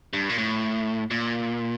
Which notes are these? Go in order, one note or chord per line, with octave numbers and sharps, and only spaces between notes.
G2
A#2
A2
A#2